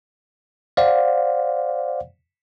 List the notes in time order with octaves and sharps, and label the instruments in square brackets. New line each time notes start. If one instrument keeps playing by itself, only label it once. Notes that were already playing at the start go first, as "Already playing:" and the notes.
[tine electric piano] C5 D5 F5 F#5